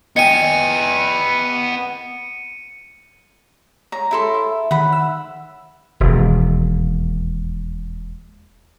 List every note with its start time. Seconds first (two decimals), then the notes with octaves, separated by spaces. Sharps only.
0.16 B3 D#5 G5 G#5 C#7 D#7
3.92 C#5 A#5
4.11 E4 A4 C6
4.34 E5
4.71 D#3 F#5 B5
4.92 E6
6.00 E1 D#2